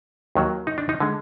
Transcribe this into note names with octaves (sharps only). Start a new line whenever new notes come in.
D#2 D#3 F#3
D#4
D4
D#4
D3 G#3